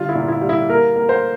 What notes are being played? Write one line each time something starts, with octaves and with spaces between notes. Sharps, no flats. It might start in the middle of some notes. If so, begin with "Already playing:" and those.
Already playing: D3 G3 F4
E4
A#2
E4
G3
E4
A#3 A#4
A#3
C5